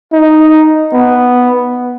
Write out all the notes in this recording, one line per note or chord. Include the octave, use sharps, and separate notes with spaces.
D#4
B3